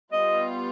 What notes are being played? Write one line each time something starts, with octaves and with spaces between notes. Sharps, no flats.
G3 B3 F4 D#5